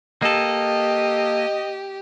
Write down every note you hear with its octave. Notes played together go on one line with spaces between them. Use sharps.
A#3 G4 A4 D#5